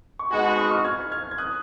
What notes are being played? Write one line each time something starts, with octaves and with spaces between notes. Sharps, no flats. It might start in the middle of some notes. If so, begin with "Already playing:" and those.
C#6
B2 G#3 D#4 F#4 G#5 B5
G#5 B5
B5 D#6
C#6 F6
F6 G#6
F6 G#6
G#6
D#6 F#6